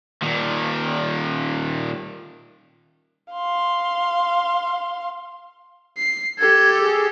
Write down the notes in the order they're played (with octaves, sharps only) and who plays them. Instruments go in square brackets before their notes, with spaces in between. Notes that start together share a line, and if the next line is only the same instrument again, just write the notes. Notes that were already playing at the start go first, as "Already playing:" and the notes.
[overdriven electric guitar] A#2 D#3
[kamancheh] F5 C6
[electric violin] C7
[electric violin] G4 A4 [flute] G#6
[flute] G#4